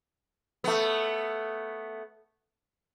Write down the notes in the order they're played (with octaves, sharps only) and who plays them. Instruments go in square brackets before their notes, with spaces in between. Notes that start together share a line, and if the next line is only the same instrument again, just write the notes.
[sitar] A3 B3